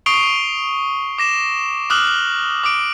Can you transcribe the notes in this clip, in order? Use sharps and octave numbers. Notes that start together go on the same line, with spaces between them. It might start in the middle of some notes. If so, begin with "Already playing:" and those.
C#6 D#6 C7 D7 F7 G7
D6 A#6 E7
D6 D#6 F6 F#6 F#7
D6 D#6 D7